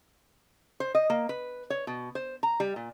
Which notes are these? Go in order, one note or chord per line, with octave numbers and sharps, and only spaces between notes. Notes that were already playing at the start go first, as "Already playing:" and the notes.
C5
D#5
A#3
B4
C#5
B2
C5
A#5
G3
A#2